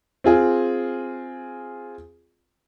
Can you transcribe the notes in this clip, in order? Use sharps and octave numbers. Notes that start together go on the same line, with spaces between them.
C4 F4 G#4